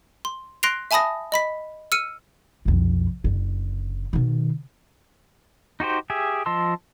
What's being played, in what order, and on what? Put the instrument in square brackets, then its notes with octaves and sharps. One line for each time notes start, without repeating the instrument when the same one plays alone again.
[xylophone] C6
C6 F#6 A#6 C7 D7 F7
E5 G#5 A5 B5 D#6 A#6
D#5 B5 B6
E6 F6 C#7 D#7
[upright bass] B1 F2
F#1 D3
B2 D#3
[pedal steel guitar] D#4 F#4 G4 C5
G4 G#4 E5
F3 D#5 A5 C6 E6